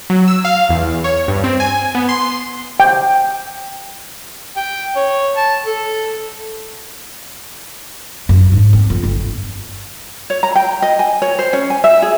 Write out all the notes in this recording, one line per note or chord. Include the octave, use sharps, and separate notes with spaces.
F#3
E6
F5
E2
C#5
G2
C4
G#5
B3
C6
G5
G5
C#5
A5
A4
F#2
G#2
C4
F2
G1
C#5
A#5
G5
D#5
G#5
C#5
C5
C#4
G#5
E5
G#4